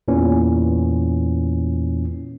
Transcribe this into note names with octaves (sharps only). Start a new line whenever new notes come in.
E2 A#2 E3 C#4